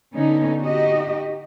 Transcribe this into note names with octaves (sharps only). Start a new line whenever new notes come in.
D3 B3 C#4 D#4
D#4 F#4 G4 D#5